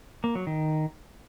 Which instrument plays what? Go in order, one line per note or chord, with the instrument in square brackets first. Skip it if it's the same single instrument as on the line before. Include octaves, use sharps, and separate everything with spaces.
[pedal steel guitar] A#3
F#3
D#3